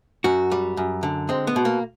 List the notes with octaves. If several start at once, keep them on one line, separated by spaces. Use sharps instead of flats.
F#2 F#4
G3
F#2
D3
G#3 C4
B3
B2
A#3